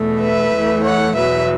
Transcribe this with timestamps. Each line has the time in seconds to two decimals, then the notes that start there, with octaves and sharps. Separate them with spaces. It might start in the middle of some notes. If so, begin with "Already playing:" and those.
Already playing: E2 B2 A3
0.21 B4 E5
0.53 E2 E3 A3
0.84 C#5 F#5
1.15 E2 B2 F#3 B4 E5